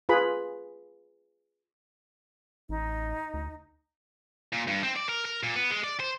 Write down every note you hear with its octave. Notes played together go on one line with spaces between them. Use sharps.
F4 G#4 B4 B5
A1 D#4
D2
A#2
G2
C4
D5
A#4
A#4
A#2
B3
G#3
D5
C5